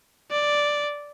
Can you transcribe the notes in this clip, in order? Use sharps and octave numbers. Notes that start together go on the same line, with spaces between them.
D5